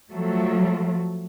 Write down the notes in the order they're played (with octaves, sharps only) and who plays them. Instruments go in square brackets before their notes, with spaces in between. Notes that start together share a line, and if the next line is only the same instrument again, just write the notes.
[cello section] F3 F#3 A3